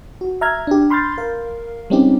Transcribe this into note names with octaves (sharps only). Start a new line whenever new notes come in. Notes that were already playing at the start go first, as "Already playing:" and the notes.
F#4
E5 A#5 F6 G#6
D4 G4
B5 C6 F6 G6 A6
A#4 F5
G3 G#3 C4 C#4 D#4 G4